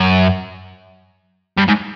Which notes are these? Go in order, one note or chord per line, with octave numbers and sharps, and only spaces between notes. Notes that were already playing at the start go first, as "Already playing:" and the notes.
Already playing: F#2
G2
G#2